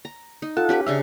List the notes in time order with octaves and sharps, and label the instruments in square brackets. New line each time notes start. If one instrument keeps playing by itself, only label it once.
[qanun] A#5
D#4
[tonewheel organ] F4 A4 F#5 [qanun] A5
[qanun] C#4 G4 B4
[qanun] C#3 D4 F5 [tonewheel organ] E5